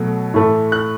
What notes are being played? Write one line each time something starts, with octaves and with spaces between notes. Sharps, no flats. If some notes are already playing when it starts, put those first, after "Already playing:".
Already playing: B2 F#3 A3
A2 E3 A3
F#6